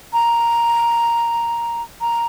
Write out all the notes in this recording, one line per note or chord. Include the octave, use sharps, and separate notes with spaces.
A#5
A#5